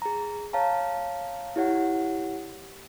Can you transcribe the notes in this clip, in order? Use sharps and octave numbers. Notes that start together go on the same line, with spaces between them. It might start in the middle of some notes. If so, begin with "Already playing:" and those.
G#4 A#5
C#5 F5 A5 A#5
E4 G4 C#5 F#5